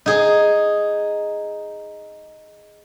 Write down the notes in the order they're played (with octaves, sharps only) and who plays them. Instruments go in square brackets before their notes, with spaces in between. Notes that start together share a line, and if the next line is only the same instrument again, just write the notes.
[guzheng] D#4 G#4